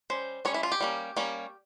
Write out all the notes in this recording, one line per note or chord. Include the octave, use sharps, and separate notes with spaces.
G3 C#4 C5
G3 C#4 C#5
E4
F4
G4
G3 A#3 C#4
G3 A#3 C#4